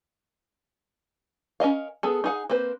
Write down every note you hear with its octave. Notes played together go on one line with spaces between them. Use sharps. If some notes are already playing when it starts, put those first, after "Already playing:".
C#4 A#4 D#5 F5
B3 G#4 A4
D#4 G#4 F#5
A#3 C4 B4 C5